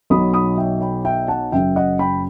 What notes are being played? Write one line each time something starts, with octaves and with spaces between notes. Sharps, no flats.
B1 B2 F#3 B5 D#6
B5 D#6
E5 G5
G5 B5
E5 G5
F#5 A5
F#1 F#2 F#3 E5 G5
D#5 F#5
G5 B5